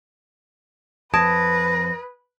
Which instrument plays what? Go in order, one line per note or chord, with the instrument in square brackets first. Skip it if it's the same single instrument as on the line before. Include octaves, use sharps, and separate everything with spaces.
[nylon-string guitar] F2 A5 [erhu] B4 [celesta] D#6 G#6 D7 [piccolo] A#6